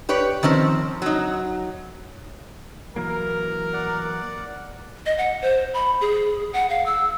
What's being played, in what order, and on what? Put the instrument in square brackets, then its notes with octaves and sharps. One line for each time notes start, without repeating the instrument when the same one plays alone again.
[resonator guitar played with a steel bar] G4 B4 C#5 D5
D#3 F3 C4 C#4
F#3 D#4
[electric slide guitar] E3 F#3 A#3 [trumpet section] A#4
[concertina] D5 F#5
[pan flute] D#5
F#5
C5
B5
G#4
F#5
F5
E6